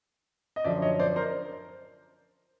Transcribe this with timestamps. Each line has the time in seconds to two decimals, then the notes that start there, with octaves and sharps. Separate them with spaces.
0.56 D#5
0.64 F#2 D3 F3 D5 E5
0.82 C#5 D#5
0.99 C5 D5
1.16 A#4 C5